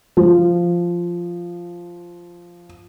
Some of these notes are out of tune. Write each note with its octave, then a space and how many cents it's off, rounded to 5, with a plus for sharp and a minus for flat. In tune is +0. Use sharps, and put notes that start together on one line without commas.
F3 -5